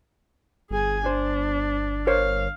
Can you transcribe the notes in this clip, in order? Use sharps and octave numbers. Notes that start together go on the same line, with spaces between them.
G1 G#4 G#5
D4 C5
A#4 C5 C#5 F5